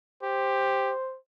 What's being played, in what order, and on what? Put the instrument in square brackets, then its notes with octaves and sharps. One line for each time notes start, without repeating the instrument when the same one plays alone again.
[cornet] G4 [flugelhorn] C5